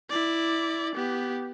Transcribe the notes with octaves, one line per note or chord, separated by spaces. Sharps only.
E4 D5
B3 G4